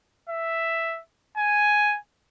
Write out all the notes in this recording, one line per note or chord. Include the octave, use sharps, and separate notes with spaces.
E5
G#5